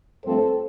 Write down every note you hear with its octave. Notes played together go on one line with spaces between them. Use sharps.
G2 F3 A3 C4 A4 C5